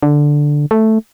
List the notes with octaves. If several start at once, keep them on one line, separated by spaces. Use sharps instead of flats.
D3
A3